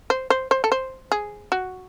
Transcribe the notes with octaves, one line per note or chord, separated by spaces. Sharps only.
C5
C5
C5
A4
C5
G#4
F#4